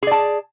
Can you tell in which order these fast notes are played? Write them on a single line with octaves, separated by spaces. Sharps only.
G#4 D5 A5